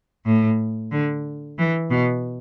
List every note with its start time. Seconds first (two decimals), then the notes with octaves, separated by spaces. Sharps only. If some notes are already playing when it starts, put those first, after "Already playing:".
0.26 A2
0.92 D3
1.58 E3
1.90 B2